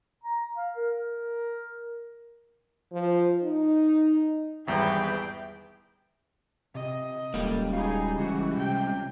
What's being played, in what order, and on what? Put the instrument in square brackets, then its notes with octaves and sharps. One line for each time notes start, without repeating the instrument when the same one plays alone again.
[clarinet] A#5
F5
A#4
[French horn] F3
D#4
[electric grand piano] G#1 E2 G3 [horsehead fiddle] G#4 B4 [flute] E5 [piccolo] G5
[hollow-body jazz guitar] C3 [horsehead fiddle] D#5
[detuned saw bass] D#1 [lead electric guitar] C#2 G3 [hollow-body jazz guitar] A#3 A4
[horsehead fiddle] D#4 G#4 [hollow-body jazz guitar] F#4 F5
[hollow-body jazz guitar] C#3 [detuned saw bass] E3 [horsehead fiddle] F#4
[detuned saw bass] C3 [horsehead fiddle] G5